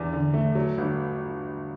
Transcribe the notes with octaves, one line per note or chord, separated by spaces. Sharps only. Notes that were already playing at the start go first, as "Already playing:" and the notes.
Already playing: E2 D4
D3
A3
F#3
G1